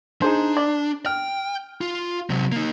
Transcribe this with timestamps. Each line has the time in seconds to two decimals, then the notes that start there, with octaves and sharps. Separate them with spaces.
0.22 D4 D#4 G#4 C5
0.57 D5
1.06 G5 F6
1.81 F4
2.30 C3 F#3
2.52 A#3 D#4